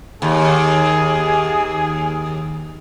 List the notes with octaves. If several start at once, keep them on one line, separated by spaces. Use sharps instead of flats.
D#2 G#4